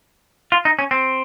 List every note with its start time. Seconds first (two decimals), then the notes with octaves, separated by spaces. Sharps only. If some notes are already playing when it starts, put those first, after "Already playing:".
0.52 F4
0.65 D#4
0.79 C#4
0.91 C4